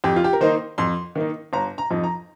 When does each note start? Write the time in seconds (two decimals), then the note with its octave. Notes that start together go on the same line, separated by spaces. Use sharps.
0.04 F2 G4
0.16 F4
0.24 G4
0.33 A#4
0.41 D#3 A#3 D#4 C5
0.78 F2 C6
1.15 D#3 A#3 D#4
1.53 G1 A#5
1.78 A#5
1.90 F2 F3 D#4
2.04 A#5